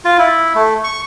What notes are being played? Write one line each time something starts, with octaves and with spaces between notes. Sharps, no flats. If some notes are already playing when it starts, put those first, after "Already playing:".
F4
E4
A3
C#6